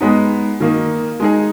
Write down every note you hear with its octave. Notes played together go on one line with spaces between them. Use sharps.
G#3 B3 D#4
D#3 A#3 D#4
G#3 D#4 G#4